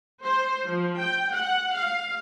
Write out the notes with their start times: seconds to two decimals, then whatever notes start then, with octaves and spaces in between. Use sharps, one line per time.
0.24 C5
0.67 F3
0.98 G5
1.34 F#5
1.75 F5